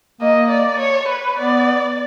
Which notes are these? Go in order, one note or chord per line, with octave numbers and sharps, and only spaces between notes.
A#3 D#5
D5
C#5
B4
B3 D5